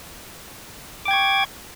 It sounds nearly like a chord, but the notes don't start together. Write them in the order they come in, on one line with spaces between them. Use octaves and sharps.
D6 G5 G#6 C#6